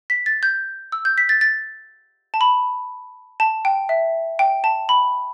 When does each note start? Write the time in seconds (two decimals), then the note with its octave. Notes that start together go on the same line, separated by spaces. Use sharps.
0.10 B6
0.26 A6
0.43 G6
0.92 E6
1.05 G6
1.18 B6
1.29 A6
1.41 A6
2.34 A5
2.41 B5
3.40 A5
3.65 G5
3.89 E5
4.39 G5
4.64 A5
4.89 B5